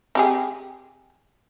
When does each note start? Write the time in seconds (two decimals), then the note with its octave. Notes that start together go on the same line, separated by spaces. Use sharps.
0.15 C4 G4 G#4